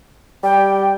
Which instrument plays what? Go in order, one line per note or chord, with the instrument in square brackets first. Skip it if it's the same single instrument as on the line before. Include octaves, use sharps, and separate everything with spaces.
[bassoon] G3 [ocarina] G5